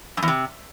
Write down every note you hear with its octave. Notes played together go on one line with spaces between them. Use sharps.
F#2
E2
C3